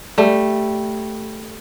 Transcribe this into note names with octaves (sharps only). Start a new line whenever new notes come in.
G3 A3